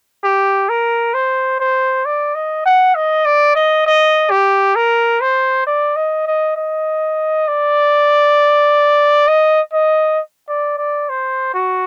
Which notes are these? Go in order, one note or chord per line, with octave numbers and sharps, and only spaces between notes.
G4
A#4
C5
C5
D5
D#5
F#5
D#5
D5
D#5
D#5
G4
A#4
C5
D5
D#5
D#5
D#5
D5
D#5
D#5
D5
D5
C5
F#4